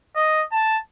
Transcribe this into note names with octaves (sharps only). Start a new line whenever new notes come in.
D#5
A5